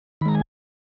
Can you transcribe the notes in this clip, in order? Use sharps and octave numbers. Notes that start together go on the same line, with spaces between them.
D#3 G#3 A#5 B5
G#5